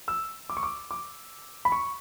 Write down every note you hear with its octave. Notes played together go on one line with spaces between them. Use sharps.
E6
D6
C#6
D6
D6
B5
C#6